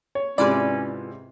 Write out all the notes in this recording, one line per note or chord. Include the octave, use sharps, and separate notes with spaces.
C#5
G#2 C3 C#4 E4 F4 B4 D5